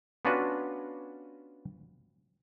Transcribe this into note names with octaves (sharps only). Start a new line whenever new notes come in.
B3 C#4 D4 F4 F#4 B4